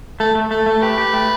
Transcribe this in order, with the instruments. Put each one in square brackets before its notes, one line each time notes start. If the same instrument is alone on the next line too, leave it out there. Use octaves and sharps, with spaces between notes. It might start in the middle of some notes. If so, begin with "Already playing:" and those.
[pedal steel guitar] A3 [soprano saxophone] A4
[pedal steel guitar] A3
[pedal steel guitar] A3 [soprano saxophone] A4
[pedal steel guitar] A3
[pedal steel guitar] G4 [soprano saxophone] B4
[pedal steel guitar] G4
A3